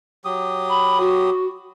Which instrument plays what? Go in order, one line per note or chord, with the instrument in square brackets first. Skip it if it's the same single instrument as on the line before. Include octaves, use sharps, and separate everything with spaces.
[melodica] F#3 G4 D#6
[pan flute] B5
F#4